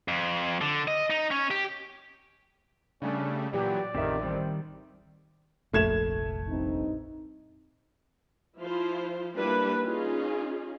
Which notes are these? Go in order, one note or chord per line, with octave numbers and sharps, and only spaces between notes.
F2
D3
D#5
D#4
C#4
G4
C#3 G3 A3 C#4 D4
A#2 E3 F#3 G4 D5
A1 F2 D#3 C4 G4 E5
D#3 G3 C4
F1 A#1 A3 G#6 E7
G2 C4 D#4
F3 E4 F4 C5
G3 A#3 D4 E4 B4
C#4 D#4 F4 G#4